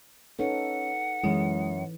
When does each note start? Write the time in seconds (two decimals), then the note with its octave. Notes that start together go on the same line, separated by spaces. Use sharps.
0.39 C#4 D#4 A4 B4 F#5
1.24 F#2 E3 G#3 E4